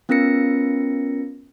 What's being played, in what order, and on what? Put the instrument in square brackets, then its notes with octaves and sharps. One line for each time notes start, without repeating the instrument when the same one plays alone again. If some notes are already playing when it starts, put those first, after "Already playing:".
[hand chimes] B3 C#4 F4 A#4 A#6 C#7